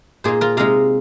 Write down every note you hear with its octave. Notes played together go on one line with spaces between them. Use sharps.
A#2 A#3 D#4 G#4 C5
F4 A#4
C3 G#3 D#4 F5 A#5